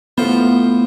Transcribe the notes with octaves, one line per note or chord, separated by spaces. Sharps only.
A2 B3 F4 C5